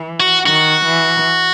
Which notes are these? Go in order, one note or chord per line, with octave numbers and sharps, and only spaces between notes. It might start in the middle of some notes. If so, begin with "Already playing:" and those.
Already playing: E3
F#4
D#3 F#4
E3